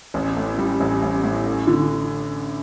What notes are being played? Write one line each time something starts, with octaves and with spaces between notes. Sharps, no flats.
A1
A2
G3
A1
A1
A2
A3
D3